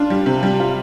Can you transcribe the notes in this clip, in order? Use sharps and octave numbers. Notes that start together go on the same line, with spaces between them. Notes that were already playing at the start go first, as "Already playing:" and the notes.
Already playing: D4 F4
G3
C3
G3
F4